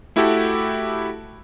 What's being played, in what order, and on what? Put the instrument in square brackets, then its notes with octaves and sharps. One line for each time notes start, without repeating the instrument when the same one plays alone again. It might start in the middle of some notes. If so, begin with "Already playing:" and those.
[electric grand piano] A3 E4 F#4 G4 A4